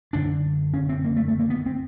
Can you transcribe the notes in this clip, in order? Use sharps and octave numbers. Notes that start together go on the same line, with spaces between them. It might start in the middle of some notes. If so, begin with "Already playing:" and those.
F#2 D3 D4
C#4
C4
A#3
A3
A3
A#3
B3
C4